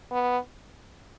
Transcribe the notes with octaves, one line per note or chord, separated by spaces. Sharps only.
B3